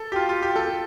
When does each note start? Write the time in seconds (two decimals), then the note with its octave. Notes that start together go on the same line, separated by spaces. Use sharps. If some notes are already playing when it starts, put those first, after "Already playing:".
Already playing: A4
0.12 G4
0.16 F4
0.29 F4
0.42 G4
0.56 A4